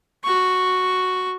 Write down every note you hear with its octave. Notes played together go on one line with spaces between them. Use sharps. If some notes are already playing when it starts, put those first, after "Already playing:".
F#4 C#6